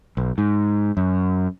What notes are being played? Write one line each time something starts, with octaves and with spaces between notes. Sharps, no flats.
B1
G#2
F#2